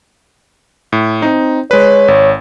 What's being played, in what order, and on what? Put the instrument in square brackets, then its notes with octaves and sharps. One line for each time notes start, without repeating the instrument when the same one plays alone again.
[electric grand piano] A2
[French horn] C4 [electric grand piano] D#4
[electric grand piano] G#3 B4 [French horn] C#5
[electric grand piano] G#1